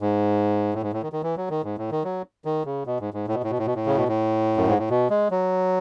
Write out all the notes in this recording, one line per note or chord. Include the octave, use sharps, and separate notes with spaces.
G#2
A2
G#2
A2
D#3
D#3
E3
F#3
D#3
G#2
A2
D#3
F#3
D#3
C#3
B2
G#2
G#2
A2
B2
A2
B2
A2
B2
A2
C#3
B2
A2
F#2
G#2
A2
B2
G#3
F#3